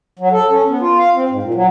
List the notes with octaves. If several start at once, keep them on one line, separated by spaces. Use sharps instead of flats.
F#3
A4
C#4
B3
F4
F5
C4
G#2
A#2
F#3